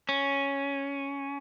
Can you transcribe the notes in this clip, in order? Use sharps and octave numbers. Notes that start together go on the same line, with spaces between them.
C#4